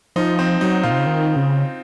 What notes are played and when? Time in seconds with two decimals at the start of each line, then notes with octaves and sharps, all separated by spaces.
0.16 F3 D#4
0.39 C4
0.61 F#3 D#4
0.83 A#2 F4
0.91 C3
0.98 C#3
1.06 D#3
1.36 C#3